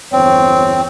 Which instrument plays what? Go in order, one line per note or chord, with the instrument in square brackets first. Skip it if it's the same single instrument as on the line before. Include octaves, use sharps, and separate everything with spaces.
[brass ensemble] G1 E2 C#5 [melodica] C4